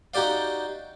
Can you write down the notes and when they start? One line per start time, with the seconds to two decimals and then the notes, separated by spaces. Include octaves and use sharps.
0.14 D#4 F#4 G4 D5 F5